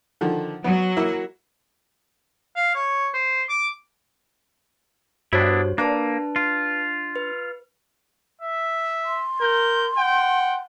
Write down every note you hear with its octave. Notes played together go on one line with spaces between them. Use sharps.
D3 D#3 F3
F#3 B3
A#3 E4
F5
C#5
C5
D6
G2 B3 D4 E4 F#4 C5 C#5
A#3 D4 B4 A5 F#6
F4
B4
E5
C6
A#4 G6
F#5 G5